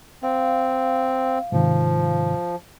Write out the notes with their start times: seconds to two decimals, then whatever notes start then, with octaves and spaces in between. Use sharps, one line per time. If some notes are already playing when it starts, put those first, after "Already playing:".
0.23 C4 F5
1.52 G#2 C3 D#3 F3